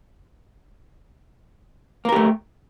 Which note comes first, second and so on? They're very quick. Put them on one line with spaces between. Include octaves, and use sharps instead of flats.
A#3 A#4 G4 A3